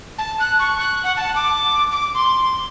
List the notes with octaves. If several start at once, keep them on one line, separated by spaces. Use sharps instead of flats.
A5
F#6
C#6
F#6
F#5
A5
D6
D6
C6